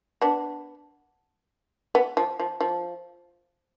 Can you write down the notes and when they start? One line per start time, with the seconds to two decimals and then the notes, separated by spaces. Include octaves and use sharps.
0.22 B3 D4
1.95 B3
2.17 F3
2.40 F3
2.61 F3